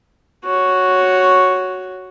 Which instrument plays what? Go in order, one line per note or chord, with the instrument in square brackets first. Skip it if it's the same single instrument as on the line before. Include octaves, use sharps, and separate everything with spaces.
[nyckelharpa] F#4 C#5